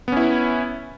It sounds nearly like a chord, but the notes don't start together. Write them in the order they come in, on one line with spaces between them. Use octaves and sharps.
B3 C#4 E4